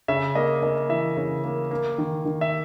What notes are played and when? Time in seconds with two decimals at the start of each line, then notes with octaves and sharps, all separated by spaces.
0.08 C#3 E5
0.35 A#3 D#5
0.62 A#3 D#5
0.89 E3 E5
1.17 C#3
1.44 A#3
1.71 A#3
1.98 D#3
2.25 D#3
2.41 E5